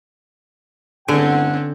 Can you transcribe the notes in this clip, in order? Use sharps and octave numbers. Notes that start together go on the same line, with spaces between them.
G1 A2 D3 C4 C#4 F#5 G#5